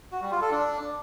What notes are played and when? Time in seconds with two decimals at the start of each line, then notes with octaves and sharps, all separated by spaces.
0.12 F#4
0.22 G3
0.32 F4
0.41 A4
0.51 D4